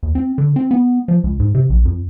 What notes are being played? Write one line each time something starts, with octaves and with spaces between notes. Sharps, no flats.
D#2
C4
D3
C4
B3
F3
C#2
G#2
C3
A#1
F2